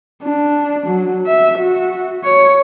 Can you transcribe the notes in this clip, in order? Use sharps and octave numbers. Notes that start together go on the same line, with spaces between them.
D4
F#3
E5
F#4
C#5